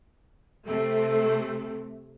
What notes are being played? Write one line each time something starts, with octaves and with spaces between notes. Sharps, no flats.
C3 A3